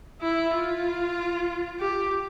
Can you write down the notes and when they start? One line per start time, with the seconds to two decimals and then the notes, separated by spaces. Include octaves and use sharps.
0.21 E4
0.53 F4
1.79 G4